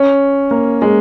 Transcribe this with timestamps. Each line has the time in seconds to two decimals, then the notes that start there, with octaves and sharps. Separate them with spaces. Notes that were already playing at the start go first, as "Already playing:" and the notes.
Already playing: C#4
0.51 A#3
0.82 G#3